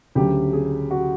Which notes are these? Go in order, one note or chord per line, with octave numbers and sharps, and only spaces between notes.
D2 C#3 F#3 G4
G#4
F#4